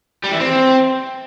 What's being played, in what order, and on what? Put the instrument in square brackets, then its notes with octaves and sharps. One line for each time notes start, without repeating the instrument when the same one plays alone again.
[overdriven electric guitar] G3
E3
C4